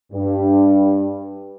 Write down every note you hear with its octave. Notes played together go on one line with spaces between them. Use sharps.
G2